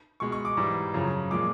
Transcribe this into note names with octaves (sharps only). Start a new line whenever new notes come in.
B2 G#3 C#6
C#6
D6
G#2 E3 G3
F#2 C#3 F3
A#2 F3 G#3 D6